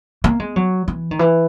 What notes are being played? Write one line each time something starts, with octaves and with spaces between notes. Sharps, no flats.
A#3
G#3
F#3
E3
D#3
E3